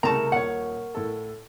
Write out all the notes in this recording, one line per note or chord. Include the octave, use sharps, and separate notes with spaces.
C2 C#3 A3 A#4 A5 A#5 C#6
D#1 C#5 F#5
A2 A4